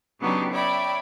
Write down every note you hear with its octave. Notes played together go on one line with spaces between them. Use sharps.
C#3 F#3 B3 D4 D#4 G4
C#5 D5 E5 G5 B5